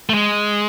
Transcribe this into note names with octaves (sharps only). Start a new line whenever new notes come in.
A3
G#3